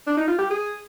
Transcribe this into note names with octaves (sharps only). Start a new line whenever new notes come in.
D4
D#4
F4
G4
G#4